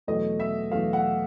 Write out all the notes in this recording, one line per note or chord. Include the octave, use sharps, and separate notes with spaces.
E2 B2 F#3 A3 D#5
E5
E2 B2 F#3 A3 F5
F#5